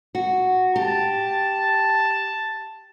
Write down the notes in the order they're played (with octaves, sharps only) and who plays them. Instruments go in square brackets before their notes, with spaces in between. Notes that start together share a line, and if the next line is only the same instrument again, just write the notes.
[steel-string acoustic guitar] F#4
[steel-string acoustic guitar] G4 [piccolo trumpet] A5